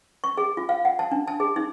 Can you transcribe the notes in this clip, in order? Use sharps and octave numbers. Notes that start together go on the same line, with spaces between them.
C#6
G#4
F4
F5
F#5
A5
D4
A5
G#4
D#4